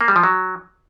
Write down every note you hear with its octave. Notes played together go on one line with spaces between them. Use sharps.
A#3
G3
F3
F#3